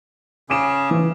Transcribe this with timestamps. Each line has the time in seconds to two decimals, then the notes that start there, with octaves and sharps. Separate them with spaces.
0.50 C#3 C#4 G#4 D6 D7 E7
0.91 E3 B4